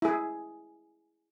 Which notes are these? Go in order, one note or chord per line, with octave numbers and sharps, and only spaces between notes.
E4 G#4